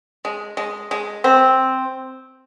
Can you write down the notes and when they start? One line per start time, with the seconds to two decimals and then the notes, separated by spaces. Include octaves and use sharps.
0.25 G#3
0.57 G#3
0.91 G#3
1.24 C4